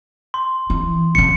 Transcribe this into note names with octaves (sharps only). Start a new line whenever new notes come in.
C6
E3
A2 C#3 C#7